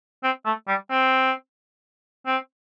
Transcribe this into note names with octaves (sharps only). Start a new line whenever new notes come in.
C4
A3
G3
C4
C4